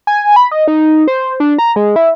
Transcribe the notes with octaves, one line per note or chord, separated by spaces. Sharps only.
G#5
B5
D#5
D#4
C5
D4
A#5
G#3
E4